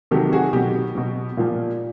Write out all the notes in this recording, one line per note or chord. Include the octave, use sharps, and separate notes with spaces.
C3 D#3 F#3 G4 A4
F#4 G#4
B2 F#3 G4
B2 F#3
A#2 F3